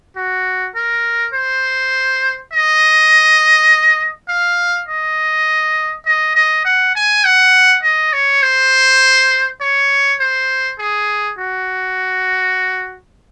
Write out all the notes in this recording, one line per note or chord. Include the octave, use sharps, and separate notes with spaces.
F#4
A#4
C5
D#5
F5
D#5
D#5
D#5
F#5
G#5
F#5
D#5
C#5
C5
C#5
C5
G#4
F#4